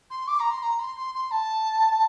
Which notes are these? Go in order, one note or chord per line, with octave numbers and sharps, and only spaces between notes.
C6
D6
A#5
C6
A#5
C6
C6
C6
A5